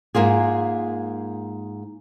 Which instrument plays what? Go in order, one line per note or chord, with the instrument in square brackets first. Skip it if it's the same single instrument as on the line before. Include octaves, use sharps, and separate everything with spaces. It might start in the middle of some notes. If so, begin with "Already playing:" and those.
[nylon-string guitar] G#2 A#3 F4 G#4